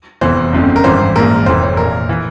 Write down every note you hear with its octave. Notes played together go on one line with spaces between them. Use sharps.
F1 E2 E3 C5
G1 F2 C#3
A#4
G#1 G2 E3 C5
A#1 G#2 E3 A#4
F1 F2 E3 C5
C#5
A#1 A#2 A#4
E3